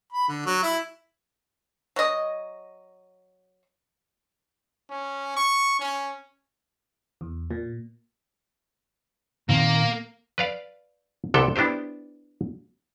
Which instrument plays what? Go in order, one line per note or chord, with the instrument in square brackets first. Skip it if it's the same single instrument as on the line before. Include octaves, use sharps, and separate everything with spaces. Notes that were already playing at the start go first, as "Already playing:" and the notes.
[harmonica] B5
D3
F#3
E4
[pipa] F#3 D#5
[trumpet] C#4
C#6
C#4
[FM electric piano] E2
A#2
[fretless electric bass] A#2 D#3 C4 [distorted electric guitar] A#3
[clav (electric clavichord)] B4 D5 F5
C2 C3 B3 A4 G5
B3 D4 E4 G4 C5